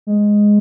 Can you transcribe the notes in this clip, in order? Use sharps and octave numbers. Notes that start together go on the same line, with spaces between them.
G#3